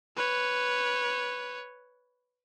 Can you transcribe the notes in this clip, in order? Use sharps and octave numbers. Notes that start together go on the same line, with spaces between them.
B4 C#5